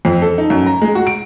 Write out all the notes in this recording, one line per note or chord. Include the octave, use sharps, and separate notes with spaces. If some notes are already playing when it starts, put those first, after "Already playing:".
F2
A4
D#4
F#2
A#5
G#3
F#4
D7